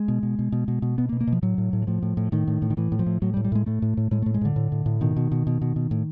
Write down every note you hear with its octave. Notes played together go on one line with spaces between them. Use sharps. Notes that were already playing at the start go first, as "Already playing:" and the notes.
Already playing: G#3
B2
B2
B2
B2
B2
B2
B2 B3
A#3
B2
A#3
B2
F3
A2 F#3
A2
A2
E3
A2 F3
A2
A2
A2 D#3
A2
A2
D#3
A2 E3
A2
F3
A2
A2 F#3
G3
A2
G3
A2 G#3
A2 A3
A2
A2
A2 G#3
A2 A3
G#3
A2 D3
A2
A2
A2
B2 D#3
B2
B2
B2
B2
B2
A2